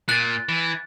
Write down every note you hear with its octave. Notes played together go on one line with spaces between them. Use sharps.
A#2 F#6 A6
E3